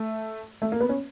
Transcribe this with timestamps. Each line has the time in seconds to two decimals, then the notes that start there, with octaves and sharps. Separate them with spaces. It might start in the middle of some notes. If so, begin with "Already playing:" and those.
Already playing: A3
0.62 A3
0.72 A#3
0.81 B3
0.89 C#4